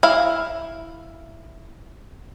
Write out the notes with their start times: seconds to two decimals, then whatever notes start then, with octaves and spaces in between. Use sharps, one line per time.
0.03 E4 F5